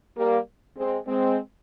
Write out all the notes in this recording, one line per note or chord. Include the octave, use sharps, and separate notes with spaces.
G3 A#3
G#3 C4
G#3 C4